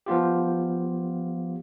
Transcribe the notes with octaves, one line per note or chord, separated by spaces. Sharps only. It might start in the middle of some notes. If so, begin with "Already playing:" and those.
F3 B3 F4 G4